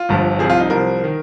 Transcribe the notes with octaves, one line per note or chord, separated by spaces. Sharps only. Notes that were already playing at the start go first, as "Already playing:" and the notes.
Already playing: F4
G1 G2 F3
C2 C3 F3 G#4
F4
D#4
C2 C3 F3 A#4
D#3